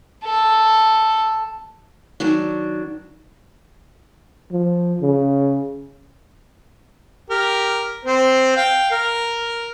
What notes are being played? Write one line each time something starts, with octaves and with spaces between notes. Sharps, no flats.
A4
D#3 F#3 D4
F3
C#3
G4 A#4
C4 C5
F5 G5
A#4